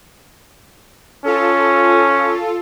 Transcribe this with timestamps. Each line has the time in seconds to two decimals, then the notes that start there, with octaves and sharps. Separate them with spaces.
1.25 C#4 F4 A4